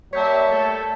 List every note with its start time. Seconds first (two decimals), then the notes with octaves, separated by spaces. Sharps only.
0.13 G3 A#3 C#5 E5 A5 G6 B6
0.51 A3 A4